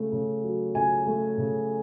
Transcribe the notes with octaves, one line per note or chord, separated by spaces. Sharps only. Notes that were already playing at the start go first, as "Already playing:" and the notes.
Already playing: C#3 A3
C#3
F#3
C#3 G#5
A3
C#3